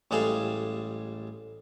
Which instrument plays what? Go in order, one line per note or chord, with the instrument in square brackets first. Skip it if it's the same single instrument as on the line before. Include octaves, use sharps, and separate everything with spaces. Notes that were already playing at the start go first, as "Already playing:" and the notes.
[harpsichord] A1 G3 G#3 G#4 A4 F5